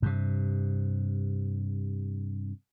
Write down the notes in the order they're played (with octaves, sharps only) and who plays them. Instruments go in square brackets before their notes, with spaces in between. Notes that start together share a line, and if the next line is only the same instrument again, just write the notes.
[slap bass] G2 C3